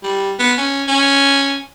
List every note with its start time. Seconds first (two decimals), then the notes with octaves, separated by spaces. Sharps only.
0.03 G3
0.39 B3
0.58 C#4
0.88 C#4